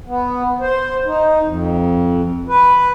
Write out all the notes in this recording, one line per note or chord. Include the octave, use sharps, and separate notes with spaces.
B3
C5
D#4
F2
B4